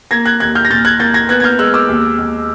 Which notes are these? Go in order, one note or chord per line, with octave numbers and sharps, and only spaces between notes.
A#3 G#6 A#6
F#6 G#6
D#2 F#6 G#6
F6 G6
A#6
A#2 G6 A6
F#6 G#6
A#3 G6 A6
G#6 A#6
B3 F#6 G#6
G#6
F6 G6
G#3 E6 F#6
D6 E6
D#2
D#2